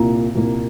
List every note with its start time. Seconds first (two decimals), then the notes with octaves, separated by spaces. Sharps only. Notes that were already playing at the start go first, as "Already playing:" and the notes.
Already playing: C2 A#2 A#3 A#5
0.35 C2 A#2 A#3